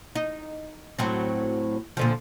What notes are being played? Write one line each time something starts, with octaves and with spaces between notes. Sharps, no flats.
D#4
A2 F#3 C4
A#2 D3 F3